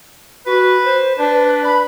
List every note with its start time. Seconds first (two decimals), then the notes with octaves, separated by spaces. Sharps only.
0.46 F#4 B4
0.85 C5
1.19 D4 B4
1.65 B5